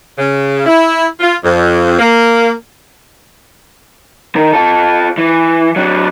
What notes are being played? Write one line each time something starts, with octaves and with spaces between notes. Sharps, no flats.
C#3
E4
F4
F2
A#3
D#3 A#4
F4 A4
E3
F#3 D4